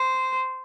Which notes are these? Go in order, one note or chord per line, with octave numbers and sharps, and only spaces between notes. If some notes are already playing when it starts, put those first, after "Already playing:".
Already playing: C5